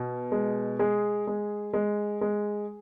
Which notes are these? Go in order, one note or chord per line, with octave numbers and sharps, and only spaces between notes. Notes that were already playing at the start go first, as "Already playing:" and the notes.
Already playing: B2
G#3
G#3 G#4
G#3
G#3
G#3